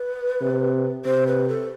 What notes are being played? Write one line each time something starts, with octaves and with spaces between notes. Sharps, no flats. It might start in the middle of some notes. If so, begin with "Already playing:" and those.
Already playing: B4
C3
C3 C5
B4
A4